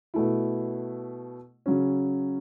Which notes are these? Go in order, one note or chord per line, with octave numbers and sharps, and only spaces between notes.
B2 A3 E4
C#3 F#3 C#4